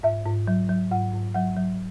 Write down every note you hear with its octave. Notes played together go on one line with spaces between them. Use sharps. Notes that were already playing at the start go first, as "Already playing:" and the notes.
G#2 E5
G#2
F#3
F#3
G#2 F#5
G#2
F#3 F#5
F#3